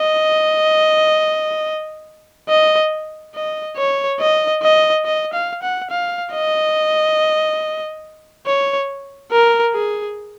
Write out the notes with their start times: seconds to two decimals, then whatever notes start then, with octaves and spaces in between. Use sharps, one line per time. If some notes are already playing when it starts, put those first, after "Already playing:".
Already playing: D#5
2.49 D#5
3.35 D#5
3.77 C#5
4.20 D#5
4.62 D#5
5.05 D#5
5.33 F5
5.62 F#5
5.90 F5
6.33 D#5
8.47 C#5
9.32 A#4
9.74 G#4